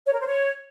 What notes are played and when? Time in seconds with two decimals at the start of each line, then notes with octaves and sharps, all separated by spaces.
0.06 C#5
0.13 A#4
0.20 C5
0.27 C#5